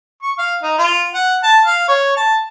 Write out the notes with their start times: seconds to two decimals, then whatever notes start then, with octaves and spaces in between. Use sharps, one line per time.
0.23 C#6
0.39 F5
0.62 D#4
0.78 F4
1.14 F#5
1.43 A5
1.66 F5
1.88 C#5
2.17 A5